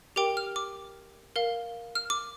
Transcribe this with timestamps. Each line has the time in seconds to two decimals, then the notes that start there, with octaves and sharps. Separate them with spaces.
0.16 G4 A#4 G5 D6
0.37 F6
0.56 D6
1.36 A#4 F5
1.95 F6
2.10 D6